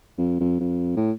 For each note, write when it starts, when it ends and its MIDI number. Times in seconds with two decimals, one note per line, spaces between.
0.18 0.36 41
0.40 0.57 41
0.60 0.92 41
0.97 1.12 45